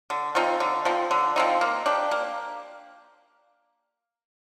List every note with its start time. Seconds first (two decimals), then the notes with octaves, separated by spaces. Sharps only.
0.10 D3
0.35 F3 C4 D#4
0.60 D3
0.85 F3 C4 D#4
1.11 D3
1.36 F3 C4 D#4
1.61 A#3
1.86 D4 G4
2.11 A#3